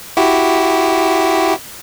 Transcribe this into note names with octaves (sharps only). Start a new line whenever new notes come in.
E4 F#4 G4